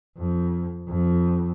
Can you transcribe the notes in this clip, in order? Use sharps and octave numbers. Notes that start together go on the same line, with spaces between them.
F2
F2